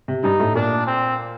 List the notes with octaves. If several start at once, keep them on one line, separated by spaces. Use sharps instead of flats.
C3
G2 G3 D#4
A2 A3
A#2 A#3 D4
C4